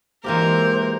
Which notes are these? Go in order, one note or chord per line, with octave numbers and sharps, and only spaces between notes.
E3 G#3 A#3 F4 G4 A#4 C5